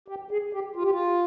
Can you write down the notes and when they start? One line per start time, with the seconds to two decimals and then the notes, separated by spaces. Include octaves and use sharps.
0.08 G4
0.31 G#4
0.53 G4
0.76 F4
0.83 G4
0.91 F4